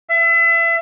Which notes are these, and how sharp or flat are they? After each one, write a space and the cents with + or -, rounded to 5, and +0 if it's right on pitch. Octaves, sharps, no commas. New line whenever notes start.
E5 +30